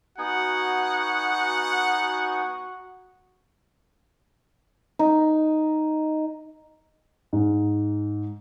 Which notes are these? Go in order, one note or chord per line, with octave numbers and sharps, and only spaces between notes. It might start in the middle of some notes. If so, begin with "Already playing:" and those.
B3 D#4 F#4 F#5 G#5
D#4
G#2